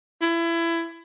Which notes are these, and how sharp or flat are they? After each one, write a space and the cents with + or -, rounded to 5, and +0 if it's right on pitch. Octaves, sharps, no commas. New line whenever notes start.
E4 +25